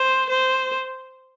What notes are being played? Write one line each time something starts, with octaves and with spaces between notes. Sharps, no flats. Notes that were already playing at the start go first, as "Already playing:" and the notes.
Already playing: C5
C5